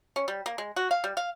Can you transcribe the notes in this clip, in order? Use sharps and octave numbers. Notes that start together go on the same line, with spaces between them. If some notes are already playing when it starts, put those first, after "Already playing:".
C#4
G3
A#3
G#3
F#4
F5
G3
F5